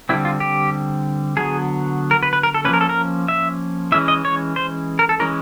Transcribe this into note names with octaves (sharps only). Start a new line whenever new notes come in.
D3 G3 C4 E4
F4
G4
D3 F#3 B3 G#4
A#4
B4
B4
A#4
A4
F3 A#3 C#4 B4
A#4
A4
A#4
E5
E3 G#3 C#4 E5
D#5
C#5
C5
A#4
A4
E3 G#3 C#4 A#4